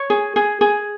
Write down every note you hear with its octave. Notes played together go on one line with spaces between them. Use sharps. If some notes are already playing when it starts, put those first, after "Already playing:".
Already playing: C#5
G#4
G#4
G#4